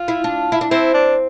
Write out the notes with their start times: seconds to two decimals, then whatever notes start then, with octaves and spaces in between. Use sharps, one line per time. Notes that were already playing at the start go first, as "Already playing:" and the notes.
Already playing: F4
0.08 E4
0.24 D4
0.52 E4
0.61 D4
0.71 C4 E4
0.94 D4